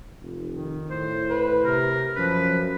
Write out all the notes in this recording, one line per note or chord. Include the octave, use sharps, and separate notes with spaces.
F1
D#3
A2 C5
B4
C3 A#4
F#2 F3 B4